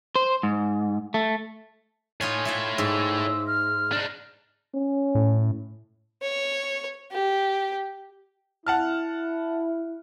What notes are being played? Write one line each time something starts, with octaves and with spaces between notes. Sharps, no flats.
C5
G#2
A3
A2 D#4 F4 C#5 G#5
E4 F4 E5
G#2 E6
F6
D4 D#4
C#4
A2
C#5
G4
E4 F#5 A5 F6